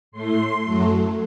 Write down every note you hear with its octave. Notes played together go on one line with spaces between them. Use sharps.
A2 A3 C6
F#2 F#3 A3